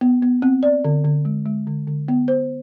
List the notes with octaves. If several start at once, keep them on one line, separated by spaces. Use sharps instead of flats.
B3
B3
C4
D5
D3
D3
G#3
G#3
D3
D3
B3
C5